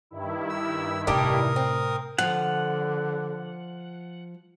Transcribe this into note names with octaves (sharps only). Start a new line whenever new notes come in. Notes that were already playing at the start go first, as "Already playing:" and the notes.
G2 D#3 E4
E6
A2 C3 G3 D4 G4 A#4 D#6
C4
D3 F3 F#5